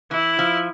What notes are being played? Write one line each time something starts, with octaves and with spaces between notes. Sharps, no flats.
E3 E4
F3